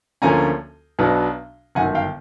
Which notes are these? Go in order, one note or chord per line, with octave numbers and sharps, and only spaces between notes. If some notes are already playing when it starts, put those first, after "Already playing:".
D2 D3 F3 A#3 C#4 G#5 A#5
B1 B2 F#3 B3 D4
G1 F#2 D#3 F#5 G#5
F5 G5